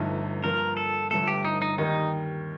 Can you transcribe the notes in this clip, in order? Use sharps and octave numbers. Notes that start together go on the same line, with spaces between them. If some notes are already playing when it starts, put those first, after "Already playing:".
Already playing: G1 G2 F3 A3 D#4
G2 F3 A#3 F4 A#4
A4
G1 G2 F3 A3 A4
G4
D#4
D#4
D#2 D#3 G3 D#4